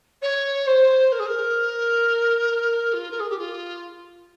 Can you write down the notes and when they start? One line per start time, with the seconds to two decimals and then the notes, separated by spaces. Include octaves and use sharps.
0.22 C#5
0.67 C5
1.12 A#4
1.19 G#4
1.26 A#4
2.93 F4
3.10 A#4
3.19 G#4
3.29 G4
3.38 F4